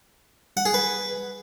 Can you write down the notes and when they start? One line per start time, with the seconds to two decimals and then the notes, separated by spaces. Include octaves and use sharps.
0.57 F#5
0.66 G#4
0.74 B4